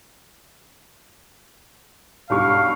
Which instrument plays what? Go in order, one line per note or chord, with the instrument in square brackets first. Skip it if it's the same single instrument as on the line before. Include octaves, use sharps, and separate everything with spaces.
[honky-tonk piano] B1 G2 C#6 [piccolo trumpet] F5